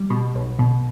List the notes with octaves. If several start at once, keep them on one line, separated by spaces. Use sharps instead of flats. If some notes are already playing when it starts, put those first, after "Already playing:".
Already playing: G3
B2
B1
B2